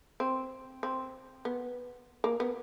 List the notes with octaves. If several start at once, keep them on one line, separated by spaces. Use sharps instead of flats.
C4
C4
B3
A#3
B3